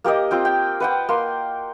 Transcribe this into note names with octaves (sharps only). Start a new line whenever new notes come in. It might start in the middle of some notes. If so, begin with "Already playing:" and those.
A#3 G4 A#4 D#5
C4 F4 G5
G5
B4 F#5 G5
A#3 C6